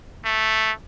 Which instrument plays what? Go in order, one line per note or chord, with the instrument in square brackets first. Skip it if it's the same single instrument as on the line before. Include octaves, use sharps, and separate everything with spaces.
[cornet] A3